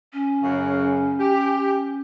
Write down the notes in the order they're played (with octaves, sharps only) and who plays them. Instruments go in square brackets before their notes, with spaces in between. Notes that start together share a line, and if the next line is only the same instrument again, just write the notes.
[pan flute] C#4
[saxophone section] F#2 C#3
G4